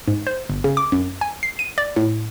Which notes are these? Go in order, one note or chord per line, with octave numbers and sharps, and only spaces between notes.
G#2
C5
G1
C#3
D6
F#2
G#5
C7
D#7
D5
A2